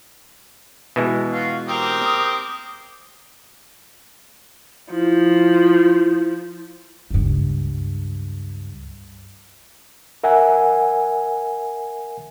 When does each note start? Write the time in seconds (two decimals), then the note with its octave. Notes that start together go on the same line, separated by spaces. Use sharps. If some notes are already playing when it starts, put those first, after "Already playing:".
0.96 B2 E3 G#3
1.33 F4 F#4
1.68 C4 G4 A#4 D#6
4.91 F3 E4
7.11 C#2 G2
10.24 A#4 E5 F#5 G#5